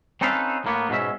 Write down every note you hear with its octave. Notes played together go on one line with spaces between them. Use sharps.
C4 C#4 D#4 A4 B4 F5
A2 A#3 B3
G#2 B2 C#4 E5